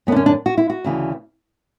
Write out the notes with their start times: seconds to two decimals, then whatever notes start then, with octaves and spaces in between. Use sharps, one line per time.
0.07 F#2 B3
0.11 D3 D4
0.16 C#4
0.26 D4
0.46 F#4
0.58 E4
0.70 F#4
0.84 D2 C#3 E3